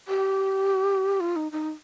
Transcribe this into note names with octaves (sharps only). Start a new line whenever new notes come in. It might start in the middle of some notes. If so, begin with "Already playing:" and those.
G4
F4
D#4
D#4